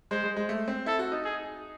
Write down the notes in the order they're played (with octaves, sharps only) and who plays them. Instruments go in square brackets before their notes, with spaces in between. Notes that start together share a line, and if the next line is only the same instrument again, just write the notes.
[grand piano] G#3 [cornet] C5
[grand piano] G#3
G#3
A3
C4
[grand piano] E4 [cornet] A4
[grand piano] F#4
D#4
[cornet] G#4